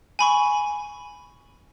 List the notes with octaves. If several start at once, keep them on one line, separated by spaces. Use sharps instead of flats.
G#5 B5 C#6